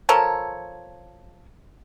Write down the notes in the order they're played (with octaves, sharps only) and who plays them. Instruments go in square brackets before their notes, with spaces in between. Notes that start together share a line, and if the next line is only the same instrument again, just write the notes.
[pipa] F3 A4 A#4 C#5